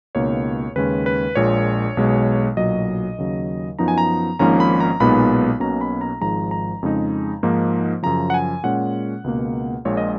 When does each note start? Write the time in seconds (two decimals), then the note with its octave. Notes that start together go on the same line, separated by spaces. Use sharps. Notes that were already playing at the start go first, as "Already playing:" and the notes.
0.15 C#2 B2 A#3 D#4 C#5
0.76 D#2 C#3 G#3 C#4 B4
1.06 B4
1.35 A#1 A#2 G#3 C#5
1.97 B1 B2 G#3
2.57 B1 A#2 F#3 D#5
3.18 D#2 C#3 F#3
3.79 F#2 F3 B3 D#4 A#5
3.88 G#5
3.98 A#5
4.39 G#1 G#2 F3 A#3 C#4 A#5
4.60 B5
4.80 A#5
5.00 B1 A#2 G#3 B3 D#4 B5
5.60 B1 B2 A#3 C#4 A#5
5.81 B5
6.01 A#5
6.21 G#1 G#2 F3 G#3 A#5
6.51 A#5
6.82 F2 C#3 G#3 D#4
7.43 G#2 F3 A#3 D#4
8.03 F#2 C#3 F3 A#5
8.30 F#5
8.34 G#5
8.63 A#2 G#3 C#4 F#5
9.24 C#2 B2 A#3
9.85 A#1 A#2 G#3 C#5
9.97 D#5